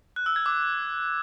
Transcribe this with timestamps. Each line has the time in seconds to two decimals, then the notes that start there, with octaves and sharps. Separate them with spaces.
0.16 F#6
0.26 E6
0.36 G#6
0.46 D6